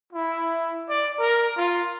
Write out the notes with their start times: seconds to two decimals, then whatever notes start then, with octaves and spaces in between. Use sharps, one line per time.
0.13 E4
0.89 D5
1.20 A#4
1.57 F4